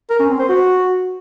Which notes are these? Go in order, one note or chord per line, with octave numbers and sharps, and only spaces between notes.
A#4
C#4
C4
C5
F#4